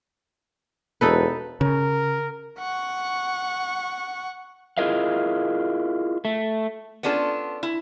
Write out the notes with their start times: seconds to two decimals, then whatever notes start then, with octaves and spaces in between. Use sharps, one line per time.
1.01 E1 D#4 A4 B4
1.61 C#3 A#4
2.59 F#5 C#6
4.78 E4 F4 G#4 A#4 D#5 F5
6.25 A3
7.03 B3 C#4 D4 F4 A4
7.63 E4